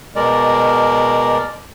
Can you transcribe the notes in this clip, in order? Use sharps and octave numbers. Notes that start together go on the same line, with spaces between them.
B2 G#3 A#4 D5